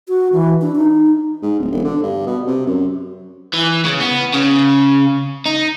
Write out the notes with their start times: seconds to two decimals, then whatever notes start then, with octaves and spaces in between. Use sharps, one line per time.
0.08 F#4
0.33 E3
0.61 D4
0.76 D#4
1.42 G#2
1.59 D1
1.72 E1
1.84 D3
2.03 G2
2.26 B2
2.47 C3
2.66 F#2
3.53 E3
3.85 C#3
4.00 B3
4.34 C#3
5.46 D#4